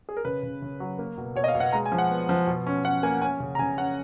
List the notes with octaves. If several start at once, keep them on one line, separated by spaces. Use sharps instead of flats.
G#4
A#4
C#3 B4
C#3
C#3
F#3
A#3
B2
B2 C#5
D#5
F5
B2
F#5
G#3 A#5
G#5
F3
F#5
B3
F3
B2
C#4
C#4 F#5
A#3 G#5
C#4 G#5
C#3
A#5
C#3 G#5
C#4 F#5